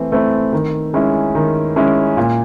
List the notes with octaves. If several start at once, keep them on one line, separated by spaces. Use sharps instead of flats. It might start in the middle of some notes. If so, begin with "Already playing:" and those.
Already playing: E3 A3 C4
A3 C4 E4
D#3
G#3 C#4 E4
D#3
G#3 C#4 E4
A#2